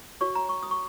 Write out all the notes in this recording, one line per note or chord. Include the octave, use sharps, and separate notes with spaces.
F#4 C#5 C#6
A#5
C#6
D#6
C#6